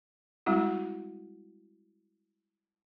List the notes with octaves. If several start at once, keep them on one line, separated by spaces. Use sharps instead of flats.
G3 G#3 C4 E4 F#4